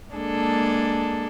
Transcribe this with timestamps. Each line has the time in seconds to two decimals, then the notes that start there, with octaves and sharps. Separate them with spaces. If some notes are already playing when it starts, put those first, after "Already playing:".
0.13 G#3 A#3 D4 G#4 A4